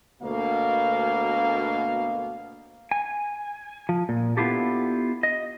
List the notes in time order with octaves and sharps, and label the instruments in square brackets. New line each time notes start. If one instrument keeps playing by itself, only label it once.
[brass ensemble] D2 B2 A#3 F5
[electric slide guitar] G#5
F3
A#2
B3 D4 E4 F4 G4 A4
D#5